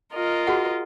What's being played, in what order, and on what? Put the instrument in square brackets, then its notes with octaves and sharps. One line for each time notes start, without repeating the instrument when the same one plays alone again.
[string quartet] F4 A#4 D#5
[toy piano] F#4 G#4 F#5